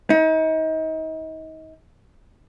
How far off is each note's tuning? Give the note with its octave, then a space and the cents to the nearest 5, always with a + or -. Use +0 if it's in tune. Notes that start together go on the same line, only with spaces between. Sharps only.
D#4 +35